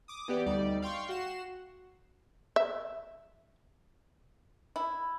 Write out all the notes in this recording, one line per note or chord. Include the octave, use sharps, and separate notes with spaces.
D6 D#6
E3 B3 G4 D5
D2 G3 D#4 D5
F5 G5 C6 C#6
F#4 F#5 C7 E7
E5
E4